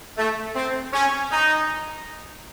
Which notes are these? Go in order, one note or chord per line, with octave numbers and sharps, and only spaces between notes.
A3
C4
C#4
D#4